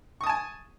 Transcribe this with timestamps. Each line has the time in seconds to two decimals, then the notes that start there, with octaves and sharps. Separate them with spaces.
0.21 C#6
0.24 D#6
0.26 A5
0.29 G#5